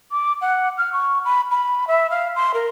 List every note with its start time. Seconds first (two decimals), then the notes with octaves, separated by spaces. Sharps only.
0.12 D6
0.41 F#5
0.78 F6
0.93 C#6
1.25 B5
1.51 B5
1.88 E5
2.11 F5
2.36 C6
2.54 A#4